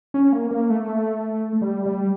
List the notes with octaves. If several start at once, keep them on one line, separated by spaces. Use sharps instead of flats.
C#4
A#3
A#3
A3
G3
G3